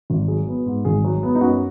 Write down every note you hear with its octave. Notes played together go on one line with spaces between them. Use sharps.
G#1
F#3 G#4
B3
G#2
G#1 G#4
F#3
B3
D#4
F#2 F#4